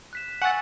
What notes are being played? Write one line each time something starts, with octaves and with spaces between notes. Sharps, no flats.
F#6 B6 E7
F#5 G#5 C#6 E6 A6